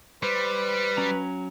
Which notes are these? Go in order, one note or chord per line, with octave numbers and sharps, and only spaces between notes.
G3 B4 C5
F#3 C#4 A#5